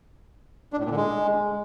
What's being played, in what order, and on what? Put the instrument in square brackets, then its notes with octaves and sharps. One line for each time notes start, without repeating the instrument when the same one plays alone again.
[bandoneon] D4
A2
A#2
D3
G#3